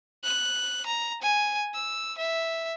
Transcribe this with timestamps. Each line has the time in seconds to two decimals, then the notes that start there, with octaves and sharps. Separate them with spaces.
0.24 F#6
0.86 A#5
1.22 G#5
1.74 E6
2.18 E5